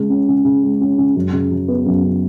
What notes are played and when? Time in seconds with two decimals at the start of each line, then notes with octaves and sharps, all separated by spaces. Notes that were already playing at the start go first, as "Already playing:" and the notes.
Already playing: C#3 G#3
0.10 C#4
0.28 C#3
0.45 C#3
0.63 G#3
0.81 C#4
0.98 C#3
1.16 F#2
1.33 C#3
1.51 F#3
1.68 B3
1.86 F#2
2.03 C#3